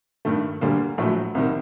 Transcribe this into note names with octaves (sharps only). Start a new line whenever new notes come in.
G2 D#3 A3
D2 D3 G3 A#3
A#1 A2 F#3 A3
C2 C3 D#3